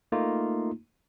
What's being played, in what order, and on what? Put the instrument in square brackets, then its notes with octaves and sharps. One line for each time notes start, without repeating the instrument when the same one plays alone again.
[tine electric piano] A3 A#3 D#4 F4